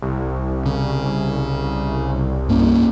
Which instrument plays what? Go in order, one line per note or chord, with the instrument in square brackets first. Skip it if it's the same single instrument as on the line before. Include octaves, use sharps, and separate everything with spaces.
[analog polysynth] C2
[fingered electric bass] C#3
G2 A#3 C#4